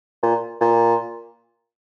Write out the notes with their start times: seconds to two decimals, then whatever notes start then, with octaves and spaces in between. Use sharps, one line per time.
0.23 A#2
0.61 A#2